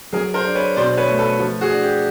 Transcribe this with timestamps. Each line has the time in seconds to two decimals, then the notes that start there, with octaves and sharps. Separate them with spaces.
0.13 F#3 G#4 A#4
0.34 A#4 C5
0.45 D4
0.55 B4 C#5
0.76 B2 C5 D5
0.97 B4 C#5
1.09 A3
1.19 A4 B4
1.39 F3
1.61 F#4 G#4
1.71 D4
1.83 G4